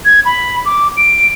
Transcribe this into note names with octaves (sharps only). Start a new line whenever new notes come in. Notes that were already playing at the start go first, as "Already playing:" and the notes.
G#6
B5
D6
D7